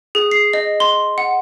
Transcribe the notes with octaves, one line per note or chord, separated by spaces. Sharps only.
G#4
C7
D#5
C6
F#5